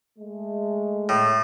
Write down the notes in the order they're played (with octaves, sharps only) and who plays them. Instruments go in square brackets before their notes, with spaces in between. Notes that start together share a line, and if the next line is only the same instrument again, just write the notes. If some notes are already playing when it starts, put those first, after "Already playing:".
[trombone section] G#3 A3
[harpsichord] A2